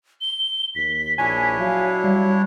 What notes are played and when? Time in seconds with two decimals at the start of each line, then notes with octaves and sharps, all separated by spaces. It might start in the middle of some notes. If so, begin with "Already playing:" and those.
0.21 G7
0.75 D#2 B6
1.18 A#1 D4 E4 C#5 G#5 B6
1.59 F#3 F5
2.04 G3